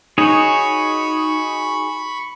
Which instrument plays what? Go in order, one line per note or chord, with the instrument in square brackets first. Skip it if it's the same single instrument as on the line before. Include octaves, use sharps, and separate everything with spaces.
[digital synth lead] D#4 [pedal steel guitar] F#4 G#4 C#5 [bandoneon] B5 C#6